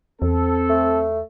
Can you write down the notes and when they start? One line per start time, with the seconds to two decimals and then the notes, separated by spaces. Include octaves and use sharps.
0.22 E2 C4 A4
0.69 A3